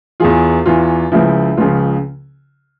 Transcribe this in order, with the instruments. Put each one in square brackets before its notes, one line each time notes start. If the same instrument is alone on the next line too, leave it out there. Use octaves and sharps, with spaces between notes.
[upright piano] E2 E3 F4 G#4
E2 E3 F4
C#2 C#3 F3 E4
C#2 C#3 F3 F4